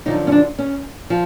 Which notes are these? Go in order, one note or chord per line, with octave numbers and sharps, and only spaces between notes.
F#2 D3 F3 D#4
C#4
D4
C#4
F3